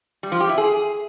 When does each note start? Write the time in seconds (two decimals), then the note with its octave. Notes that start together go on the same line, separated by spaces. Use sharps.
0.23 G3
0.32 F3
0.40 G4
0.49 E4
0.58 G#4